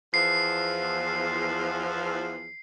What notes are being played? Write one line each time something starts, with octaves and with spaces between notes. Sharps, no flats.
E2 F3 C7